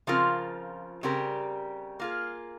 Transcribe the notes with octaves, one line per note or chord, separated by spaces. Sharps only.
C#3 F3 C4 F4 A#4
C#3 G3 C4 G4 A#4
A#3 F4 G#4